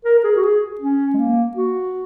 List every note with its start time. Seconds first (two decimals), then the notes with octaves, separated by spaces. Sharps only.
0.05 A#4
0.18 A#4
0.24 G#4
0.36 F#4
0.43 G#4
0.81 C#4
1.14 G#3
1.18 A#3
1.56 F#4